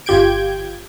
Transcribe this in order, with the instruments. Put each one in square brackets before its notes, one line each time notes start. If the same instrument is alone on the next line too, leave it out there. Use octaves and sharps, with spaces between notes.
[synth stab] G1 F4 G4 G6 G#6 D7